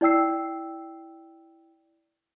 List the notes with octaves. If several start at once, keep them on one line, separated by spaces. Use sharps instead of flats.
E4 D5 G5 E6 C7